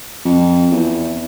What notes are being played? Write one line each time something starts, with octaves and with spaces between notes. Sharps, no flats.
F2
E2